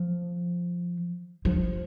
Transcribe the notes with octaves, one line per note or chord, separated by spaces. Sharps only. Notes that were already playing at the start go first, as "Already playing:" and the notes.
Already playing: F3
F3